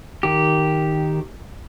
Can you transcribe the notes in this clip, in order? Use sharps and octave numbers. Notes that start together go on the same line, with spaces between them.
D#3 G4